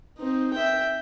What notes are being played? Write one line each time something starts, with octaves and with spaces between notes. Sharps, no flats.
C4 D#4
E5 G5